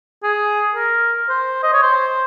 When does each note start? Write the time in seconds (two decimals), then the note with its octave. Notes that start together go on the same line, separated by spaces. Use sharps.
0.23 G#4
0.75 A#4
1.29 C5
1.63 D#5
1.74 C#5
1.82 C5